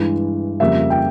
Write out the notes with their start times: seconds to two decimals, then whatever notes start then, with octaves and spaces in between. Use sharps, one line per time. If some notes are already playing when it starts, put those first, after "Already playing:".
Already playing: G2 E3 G#3
0.60 F2 C#3 G3 A#3 E5
0.90 G5